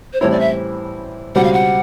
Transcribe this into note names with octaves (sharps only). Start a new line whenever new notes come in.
C5
A2 E3 G3 C4 E4 C#5
D5
E5
C#2 B2 G3 C4 F#5
F5
F#5